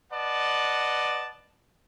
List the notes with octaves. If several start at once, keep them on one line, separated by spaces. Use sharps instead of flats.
B4 D5 D#5 F#5 A5